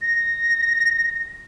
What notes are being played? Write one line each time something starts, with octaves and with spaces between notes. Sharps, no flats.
A#6